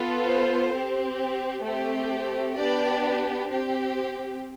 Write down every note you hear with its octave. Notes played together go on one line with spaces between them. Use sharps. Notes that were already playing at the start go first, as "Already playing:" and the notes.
Already playing: B3 F4 A4
C5
C4 G4
A3 C4 G4
B3 D4 G4 D5
C4 G4